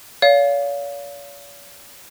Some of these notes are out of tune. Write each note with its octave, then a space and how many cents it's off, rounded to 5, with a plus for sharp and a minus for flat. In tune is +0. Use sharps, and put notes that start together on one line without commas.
C#5 +45 F5 +0